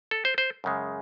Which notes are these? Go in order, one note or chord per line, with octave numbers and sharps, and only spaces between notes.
A4
C5
C5
F#2 C#3 G#3